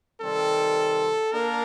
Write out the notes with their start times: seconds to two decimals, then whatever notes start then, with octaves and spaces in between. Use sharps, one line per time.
0.21 C3 D#3 G3 C4 A4
1.32 A#3 D4 A#4